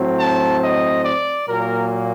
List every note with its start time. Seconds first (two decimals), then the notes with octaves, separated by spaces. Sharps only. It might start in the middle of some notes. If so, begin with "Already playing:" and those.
Already playing: A2 F#3 C4
0.19 A5
0.63 D#5
1.05 D5
1.48 A#2 F#3 A#3 A#4